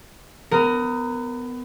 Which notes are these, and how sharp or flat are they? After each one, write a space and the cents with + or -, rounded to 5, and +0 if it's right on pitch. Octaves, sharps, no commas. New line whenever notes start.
B3 +20 A#4 -10